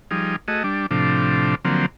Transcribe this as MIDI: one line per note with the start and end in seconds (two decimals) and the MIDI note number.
0.11 0.36 53
0.11 0.36 55
0.11 0.36 63
0.11 0.36 68
0.48 0.63 57
0.48 0.63 66
0.48 0.63 68
0.48 0.63 75
0.64 0.86 55
0.64 0.86 62
0.91 1.55 45
0.91 1.55 48
0.91 1.55 53
0.91 1.55 62
1.65 1.86 50
1.65 1.86 53
1.65 1.86 54
1.65 1.86 58
1.65 1.86 60